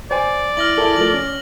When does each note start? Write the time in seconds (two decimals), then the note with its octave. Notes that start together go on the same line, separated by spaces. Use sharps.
0.11 C5 D5 G#5
0.57 E4 F6 A#6 F#7
0.78 E4 G#4 A4 F#7
0.96 F3 A3 F#7
1.13 C#4